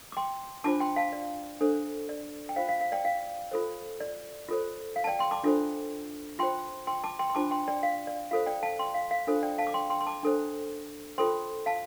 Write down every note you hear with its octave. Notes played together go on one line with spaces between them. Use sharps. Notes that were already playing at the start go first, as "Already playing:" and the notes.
D6
G5 C6
D4 F4 C5 A5 D6
G5 C6
F5 A5
D5
D4 A4 C5
D5
G5
F4 C5 F5
F5
F5
D5 G5
F5
F4 A4 C5
D5
F4 A4 C5
F5
A5
D5 G5
G5 C6
A5 D6
D4 F4 A4 C5
F4 C5 G5 C6
G5 C6
A5 D6
G5 C6
C6
D4 F4 C5 A5 D6
G5 C6
D5 G5
F5
D5
F4 A4 C5 F5
D5 G5
F5 A5
G5 C6
F5
F5
D4 F4 A4 C5
D5 G5
F5 A5
D6
G5 C6
G5 C6
C6
A5 D6
D4 A4 C5
F4 A4 C5 G5 C6
F5 A5